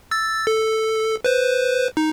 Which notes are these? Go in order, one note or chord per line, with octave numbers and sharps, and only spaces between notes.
E6 A6
A4
B4 C5
D#4